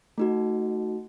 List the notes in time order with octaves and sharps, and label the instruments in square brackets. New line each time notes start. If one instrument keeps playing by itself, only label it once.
[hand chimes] A3 D#4 F#4